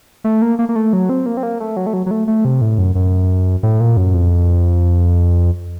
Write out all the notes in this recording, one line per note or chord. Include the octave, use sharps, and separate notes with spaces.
A3
A#3
A#3
A#3
A3
F#3
C4
A#3
C4
A#3
A3
F#3
A3
F#3
F#3
A3
A3
C3
A2
F#2
F#2
A2
A#2
F#2
F2